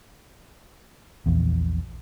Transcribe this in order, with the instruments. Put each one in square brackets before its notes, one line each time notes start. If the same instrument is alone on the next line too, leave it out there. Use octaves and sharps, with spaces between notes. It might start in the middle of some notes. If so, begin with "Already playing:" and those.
[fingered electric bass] A#1 E2